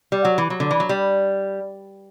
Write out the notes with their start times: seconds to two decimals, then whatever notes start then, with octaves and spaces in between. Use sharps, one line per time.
0.12 G3
0.25 F#3
0.38 E3
0.50 F#3
0.60 D3
0.71 E3
0.80 F#3
0.89 G3